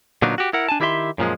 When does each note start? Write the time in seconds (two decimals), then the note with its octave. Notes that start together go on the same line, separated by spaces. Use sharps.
0.22 A#2 D3 F#3 B3 D4 D#4
0.38 F#4 G4
0.53 E4 A#4 F#5
0.69 D4 G#5 A5
0.80 D#3 E4 G4 A#4 E5 C6
1.18 F#2 A#2 F3 G#3